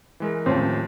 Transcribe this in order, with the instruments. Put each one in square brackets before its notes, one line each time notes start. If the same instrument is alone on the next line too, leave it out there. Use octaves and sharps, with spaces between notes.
[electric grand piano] E3 G#3 A#4
[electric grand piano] D#2 C#4 [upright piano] A2 F3 F#3 [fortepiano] C4